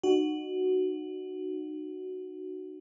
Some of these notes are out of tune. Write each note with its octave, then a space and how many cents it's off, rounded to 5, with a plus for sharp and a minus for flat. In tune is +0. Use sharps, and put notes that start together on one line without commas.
D#4 -35 F#4 +5